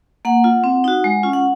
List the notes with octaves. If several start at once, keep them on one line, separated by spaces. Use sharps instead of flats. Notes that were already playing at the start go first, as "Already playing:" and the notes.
A#3 F#5
F4
C4
D#4 F#4
G#3
C#4 F4
F#5